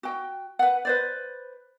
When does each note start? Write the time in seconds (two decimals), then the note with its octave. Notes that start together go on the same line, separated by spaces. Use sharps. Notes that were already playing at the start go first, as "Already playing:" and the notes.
0.03 F#4 G5
0.59 B4 F#5
0.85 B4 C5 D5